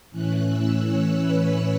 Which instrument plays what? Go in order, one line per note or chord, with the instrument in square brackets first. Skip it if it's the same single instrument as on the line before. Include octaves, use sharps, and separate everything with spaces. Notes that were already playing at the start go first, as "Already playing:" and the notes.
[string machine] A2 E3 C#4 F#6
E6
C#5
B4